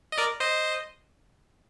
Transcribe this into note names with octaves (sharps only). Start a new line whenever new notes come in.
D#5
A#4 D5
C5 D#5